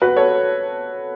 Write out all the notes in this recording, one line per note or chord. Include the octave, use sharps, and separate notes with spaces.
F#4 B4
A4 C#5